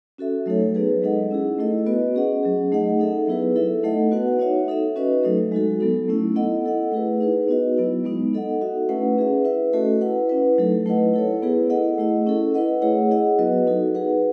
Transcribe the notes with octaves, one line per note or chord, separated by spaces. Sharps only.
C#4 F#4 A4 E5
F#3 A3 D#4 A4 C#5
F#3 B3 D#4 G#4 B4
G#3 D#4 A4 D#5 F#5
C#4 E4 G#4
A3 E4 A4 D#5
B3 F#4 B4 D#5
C#4 G#4 D#5 F#5
F#3 C#4 G#4
A3 D#4 G#4 D#5 F#5
D#4 A4 E5
F#3 B3 E4 G#4 B4
E4 A4 E5
A3 D#4 A4 D#5 F#5
B3 F#4 B4 F#5
D#4 F#4 C#5 E5
D#4 A4 E5
C#4 F#4 B4 D#5
F#3 A3 D#4 A4
G#3 D#4 F#4 A4
F#3 B3 D#4 A4
A3 C#4 E4
B3 E4 A4 D#5 F#5
E4 A4 D#5 F#5
A3 E4 G#4 B4
D#4 G#4 B4
B3 D#4 F#4 B4 D#5
F#3 B3 E4
G#3 B3 D#4
D#4 A4 D#5 F#5
D#4 F#4 A4 E5
A3 C#4 E4 B4 F#5
C#4 G#4 B4 E5
E4 B4 E5
A3 C#4 F#4 A4 D#5
E4 B4 F#5
C#4 E4 B4
F#3 A3 D#4 A4
A3 E4 B4 D#5 F#5
E4 A4 C#5
B3 E4 G#4 B4
E4 A4 D#5 F#5
A3 E4 G#4 D#5
C#4 E4 A4
E4 B4 D#5 F#5
A3 E4 G#4 C#5 F#5
E4 G#4 D#5 F#5
F#3 B3 F#4 B4 D#5
D#4 F#4 A4
D#4 G#4 B4 F#5